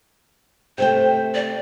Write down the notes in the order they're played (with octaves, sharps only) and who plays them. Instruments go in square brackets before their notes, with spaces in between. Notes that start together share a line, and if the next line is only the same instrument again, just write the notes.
[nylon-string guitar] C3 A3 G5 [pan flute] C5
[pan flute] D5